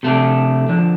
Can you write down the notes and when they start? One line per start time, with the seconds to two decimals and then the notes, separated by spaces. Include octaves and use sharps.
0.03 C3 A3 D4
0.69 D3 F3 D4